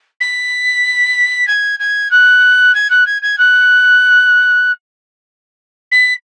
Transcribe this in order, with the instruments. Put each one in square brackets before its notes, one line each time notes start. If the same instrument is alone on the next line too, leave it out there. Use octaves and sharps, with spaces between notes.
[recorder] B6
G#6
G#6
F#6
G#6
F#6
G#6
G#6
F#6
B6